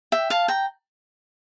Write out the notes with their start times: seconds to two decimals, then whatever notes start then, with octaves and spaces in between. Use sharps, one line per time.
0.12 E5 G5
0.30 F5 A5
0.48 G5 A#5